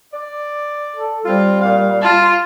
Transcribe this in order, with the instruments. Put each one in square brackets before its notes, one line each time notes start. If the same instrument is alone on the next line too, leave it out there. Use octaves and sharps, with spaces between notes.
[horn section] D5
[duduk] A4
[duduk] G3 [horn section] C4 F4
[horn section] A#2 F5
[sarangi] F4 [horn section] A5